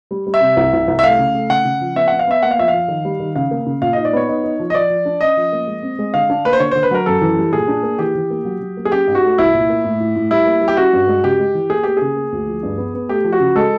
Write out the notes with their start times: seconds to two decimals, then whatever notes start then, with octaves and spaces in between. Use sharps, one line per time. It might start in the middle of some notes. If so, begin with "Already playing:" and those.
0.11 G3
0.27 G3
0.34 E5
0.41 C3
0.57 C2
0.73 C2
0.88 C2
0.99 E5
1.03 A3 F5
1.18 C#3
1.34 A3
1.49 C#3 F#5
1.65 C#3
1.81 F3
1.96 B3 E5
2.08 B3 F#5
2.19 F5
2.27 B3 E5
2.43 A#3 F#5
2.51 F5
2.58 F2 E5
2.68 F5
2.73 F3
2.88 D#3
3.05 G3
3.20 D#3
3.36 C#3 F5
3.51 A#3
3.66 C#3
3.81 A#2 F5
3.93 D#4 D#5
4.05 D5
4.13 B3 C#5
4.29 D#4
4.44 D#4
4.60 F3
4.70 D#5
4.74 F3 D5
4.90 F3
5.05 D4
5.21 C#4 D#5
5.37 F3
5.52 A#3
5.67 G#3
5.83 C4
5.99 G#3
6.14 D3 F5
6.30 D4
6.45 A#3 B4
6.53 C5
6.60 D3 C#5
6.71 D3 C5
6.83 B4
6.91 F#3 A#4
7.06 F#2 A4
7.21 E3
7.37 G3
7.53 A#2 G#4
7.68 D4
7.83 A#3
7.99 E3 G4
8.15 E3
8.30 A#3
8.45 F#3
8.60 F#3
8.77 A#3
8.85 G#4
8.92 C#4 G4
9.07 G#2
9.15 F#4
9.23 A3
9.38 C2 E4
9.54 A#2
9.70 A#3
9.84 A2
10.00 A2
10.16 A2
10.31 G3 E4
10.46 A#3
10.61 G3
10.68 G4
10.77 C#4 F#4
10.93 G2
11.08 G#3
11.24 C#3 G4
11.39 G#3
11.54 E3
11.69 A#3 G#4
11.83 A#3 G4
11.97 C#3 G#4
12.16 A#3
12.32 D2
12.47 F3
12.63 G2
12.78 B3
12.94 B3
13.09 A3 G4
13.24 F3
13.32 F#4
13.40 C#3
13.55 G#3 A4